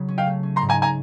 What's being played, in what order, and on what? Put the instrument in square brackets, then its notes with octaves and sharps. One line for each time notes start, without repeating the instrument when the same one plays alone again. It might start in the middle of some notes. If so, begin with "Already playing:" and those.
Already playing: [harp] C#3 F#3
C#4
[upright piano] F5 G5
[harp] A3
C#4
[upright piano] A#5 C6
[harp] G#2
[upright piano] G#5 A#5
G#5 A#5